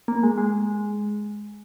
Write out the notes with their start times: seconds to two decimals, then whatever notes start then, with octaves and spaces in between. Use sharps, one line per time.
0.08 A#3
0.23 G#3
0.38 G#3